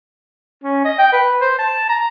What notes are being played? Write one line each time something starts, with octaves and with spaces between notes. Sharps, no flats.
C#4
D#5
G5
B4
C5
A5
A#5